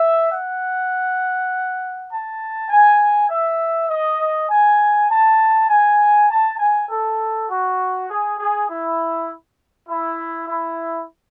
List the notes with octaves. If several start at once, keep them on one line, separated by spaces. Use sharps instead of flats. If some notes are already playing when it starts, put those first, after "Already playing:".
Already playing: E5
F#5
A5
G#5
E5
D#5
G#5
A5
G#5
A5
G#5
A4
F#4
G#4
G#4
E4
E4
E4